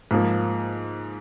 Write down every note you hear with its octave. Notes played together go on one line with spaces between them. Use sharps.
G#2 F3 A#3